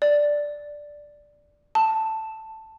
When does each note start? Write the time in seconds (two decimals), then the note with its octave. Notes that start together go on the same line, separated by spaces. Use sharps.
0.02 D5
1.75 A5